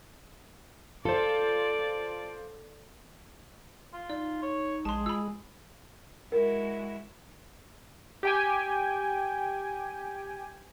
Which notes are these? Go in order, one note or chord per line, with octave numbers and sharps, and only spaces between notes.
F4 A4 C5 D5
F4
D#4 D5
C#5
A#1 G#3 G#4 A5 C6
F4 B5 E6
G#3 E4 F#4 A#4
G4 G5 G#5